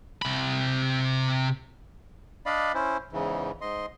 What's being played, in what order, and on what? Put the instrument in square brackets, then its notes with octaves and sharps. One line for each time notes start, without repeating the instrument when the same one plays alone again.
[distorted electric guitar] C3 B5
[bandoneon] D4 D5 D#5 F5 B5
C#4 E4 C5
E2 G#2 C#3 E3
G#2 D#5 C6